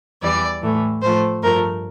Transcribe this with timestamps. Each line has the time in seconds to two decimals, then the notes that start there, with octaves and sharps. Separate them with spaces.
0.22 E2 E3 G3 D5
0.62 A2 E3 A3
1.02 A2 F3 A3 C5
1.42 G2 F3 A3 A#4